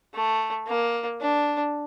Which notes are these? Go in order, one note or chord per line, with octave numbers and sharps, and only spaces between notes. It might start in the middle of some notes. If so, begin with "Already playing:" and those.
A3
A#3
D4